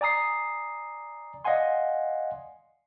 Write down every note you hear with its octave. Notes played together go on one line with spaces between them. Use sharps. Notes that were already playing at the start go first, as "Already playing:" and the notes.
D5 G#5 A#5 D#6 C7
D5 D#5 F5 F#5 G#5 C6